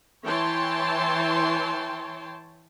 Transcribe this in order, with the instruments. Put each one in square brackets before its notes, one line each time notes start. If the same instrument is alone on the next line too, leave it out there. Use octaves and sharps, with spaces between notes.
[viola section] E3 C#5 G5 A5 C6